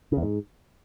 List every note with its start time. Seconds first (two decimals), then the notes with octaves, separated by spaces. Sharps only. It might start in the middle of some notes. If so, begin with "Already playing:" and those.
0.12 C#3
0.17 E2
0.23 G#2